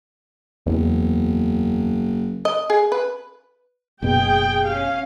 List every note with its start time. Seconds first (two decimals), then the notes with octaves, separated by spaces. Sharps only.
0.66 F#1 E2
2.45 D#5
2.70 G#4
2.92 B4
4.02 F#1 B2 G#4 G5
4.66 C#4 F5